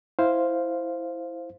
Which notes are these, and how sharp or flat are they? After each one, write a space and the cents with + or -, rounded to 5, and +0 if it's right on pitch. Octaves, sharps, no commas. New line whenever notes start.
E4 +0 C5 +0 F5 +0